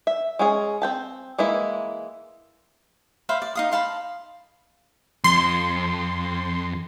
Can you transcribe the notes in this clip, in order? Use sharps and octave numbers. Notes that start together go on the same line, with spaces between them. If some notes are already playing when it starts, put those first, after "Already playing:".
E5
G#3 C#4 G#4
C4 G5 A5
E3 G#3 A#3 E4
C5 E5 F5 B5
D5
D#4 F5 D#6
C5 F5 A5 B5
F2 C6